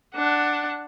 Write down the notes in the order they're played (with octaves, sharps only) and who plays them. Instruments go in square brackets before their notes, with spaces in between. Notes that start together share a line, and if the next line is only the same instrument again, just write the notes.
[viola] D4 F#5